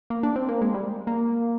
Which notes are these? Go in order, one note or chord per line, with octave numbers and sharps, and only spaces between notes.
A#3
D4
C4
A#3
G#3
G3
A#3